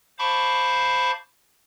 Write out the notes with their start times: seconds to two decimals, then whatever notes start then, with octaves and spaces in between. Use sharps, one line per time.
0.19 C5 F5 A5 B5 C#6 D6